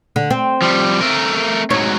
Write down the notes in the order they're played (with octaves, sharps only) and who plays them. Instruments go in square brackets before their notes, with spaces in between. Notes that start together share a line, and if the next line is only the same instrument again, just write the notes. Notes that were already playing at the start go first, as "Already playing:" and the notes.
[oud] D3
C4
[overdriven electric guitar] F3 G3
A3 A#4
[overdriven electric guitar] G#2 F#3 [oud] C#5